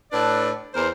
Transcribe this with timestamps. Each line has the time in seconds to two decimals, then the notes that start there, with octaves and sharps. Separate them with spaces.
0.12 A2 D4 A4 B4 D5
0.74 E2 E3 A#4 C5